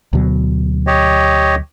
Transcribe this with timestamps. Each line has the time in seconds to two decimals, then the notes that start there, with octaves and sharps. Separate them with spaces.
0.13 D2 B2 F#3
0.87 G4 C#5 D#5